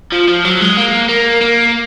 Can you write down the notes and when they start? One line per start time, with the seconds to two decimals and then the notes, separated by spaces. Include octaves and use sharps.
0.12 F3
0.28 F3
0.45 F#3
0.61 G#3
0.77 A#3
1.09 A#3
1.41 A#3